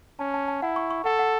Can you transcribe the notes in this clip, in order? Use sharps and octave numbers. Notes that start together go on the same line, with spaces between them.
C#4 A5
A5
A5
E4 F#5
C#6
C#6
A4 F#5
F#5